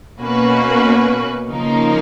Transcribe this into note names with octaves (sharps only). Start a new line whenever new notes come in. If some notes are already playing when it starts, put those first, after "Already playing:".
B2 A#3 C#4 F#4 B4
C#3 F3 A#3 D#4 A#4